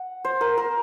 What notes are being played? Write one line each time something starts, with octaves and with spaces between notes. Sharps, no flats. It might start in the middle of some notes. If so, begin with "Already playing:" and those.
Already playing: F#5
C5
A#4
A#4